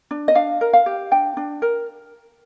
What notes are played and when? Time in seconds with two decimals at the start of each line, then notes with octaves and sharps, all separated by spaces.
0.11 D4
0.28 D#5
0.35 D4 F5
0.61 A#4
0.73 F5
0.86 G4
1.11 D4 G5
1.37 D4
1.62 A#4